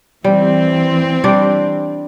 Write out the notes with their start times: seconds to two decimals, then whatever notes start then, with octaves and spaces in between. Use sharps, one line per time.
0.24 E3 G3 C4
1.24 G3 D4 D5